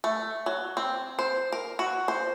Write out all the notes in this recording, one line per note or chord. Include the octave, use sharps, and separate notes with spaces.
A3
F#3
C4
C5
A#4
F#4
C5